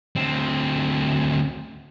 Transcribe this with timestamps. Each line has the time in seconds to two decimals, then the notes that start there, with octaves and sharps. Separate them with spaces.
0.16 D2 C4